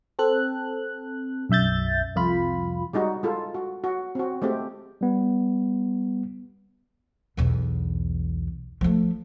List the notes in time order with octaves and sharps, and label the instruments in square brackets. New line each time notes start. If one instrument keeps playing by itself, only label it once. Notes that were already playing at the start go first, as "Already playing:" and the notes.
[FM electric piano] C4 A4 F#6
B1 F#2 E5 G6 A6
C2 F2 F4 B5
[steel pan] G3 G#3 D#4 F#4
G#3 F4 A4
F#4
F#4
C4 F#4
G#3 A3 C4 G4
[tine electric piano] G3 B3
[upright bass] B1 E2
F3 A3